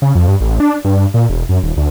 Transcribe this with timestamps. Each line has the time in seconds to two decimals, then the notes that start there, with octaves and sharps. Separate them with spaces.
0.02 C#3
0.15 F2
0.28 G2
0.40 A1
0.60 D4
0.84 G2
1.14 A#2
1.29 E1
1.49 F#2
1.63 D#1
1.77 D2